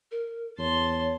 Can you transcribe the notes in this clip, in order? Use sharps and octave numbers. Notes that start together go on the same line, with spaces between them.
A#4
E2 C#5 A5 C6